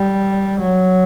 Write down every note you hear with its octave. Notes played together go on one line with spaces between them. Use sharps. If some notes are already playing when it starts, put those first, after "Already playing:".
Already playing: G3
F#3